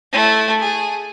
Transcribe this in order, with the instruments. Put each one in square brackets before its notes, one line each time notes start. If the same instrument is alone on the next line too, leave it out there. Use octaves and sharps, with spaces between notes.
[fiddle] A3 E4
G#4